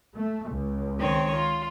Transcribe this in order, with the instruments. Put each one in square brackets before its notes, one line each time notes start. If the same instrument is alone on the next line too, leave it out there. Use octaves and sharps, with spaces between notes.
[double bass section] A3
C#2
[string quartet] D#3 C4 C#5
F4